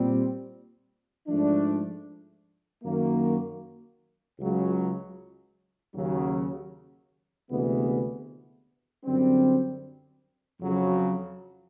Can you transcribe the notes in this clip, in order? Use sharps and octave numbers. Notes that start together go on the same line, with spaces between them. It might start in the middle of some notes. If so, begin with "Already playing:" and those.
Already playing: A#2 G3 C4
G#2 F3 A3 D4
F#2 D#3 F#3 A#3
C#2 C#3 F#3
D#2 C#3 F#3
D2 C3 E3 G#3 B3
F#2 D3 G3 C4
F2 C#3 F#3